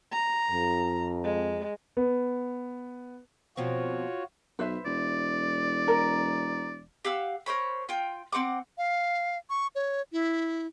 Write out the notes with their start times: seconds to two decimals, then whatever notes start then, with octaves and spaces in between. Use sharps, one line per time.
0.12 A#5
0.50 F2
1.24 G#3
1.97 B3
3.57 B2 F3 C4 F4 F#4 C#5
4.59 B1 B4 C5 E5
4.86 E1 D5
5.88 A#4
7.05 G4 F5 F#5 E6
7.46 A#4 C5 C#5 B5
7.89 F4 G5
8.32 C4 F#5 C6 D6
8.78 F5
9.50 C#6
9.75 C#5
10.12 E4